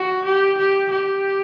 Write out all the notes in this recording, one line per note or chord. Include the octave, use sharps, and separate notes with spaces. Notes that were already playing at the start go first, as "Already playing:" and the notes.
Already playing: F#4
G4
G4
G4